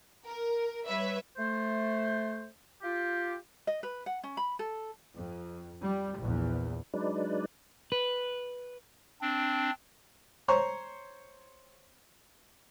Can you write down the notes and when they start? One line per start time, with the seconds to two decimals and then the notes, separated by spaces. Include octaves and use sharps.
0.25 A#4
0.85 G3 B4 C#5 E5
1.37 A3 C5
2.82 F4 G4
3.67 D#5
3.83 B4
4.06 F#5
4.23 C#4
4.37 B5
4.59 A4
5.16 F2
5.82 G3
6.20 A#1 E2
6.94 F#3 G#3 D4 D#4 B4 D5
7.92 B4
9.21 C4 D4
10.48 C5 C#5 A#5 C6 C#6